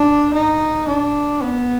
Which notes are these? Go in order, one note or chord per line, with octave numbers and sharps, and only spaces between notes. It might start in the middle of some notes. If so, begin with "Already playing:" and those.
Already playing: D4
D#4
D4
B3